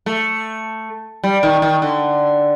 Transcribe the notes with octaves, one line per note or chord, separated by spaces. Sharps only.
A3
G3
D#3
D#3
D3